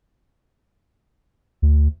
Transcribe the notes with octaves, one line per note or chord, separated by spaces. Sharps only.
D2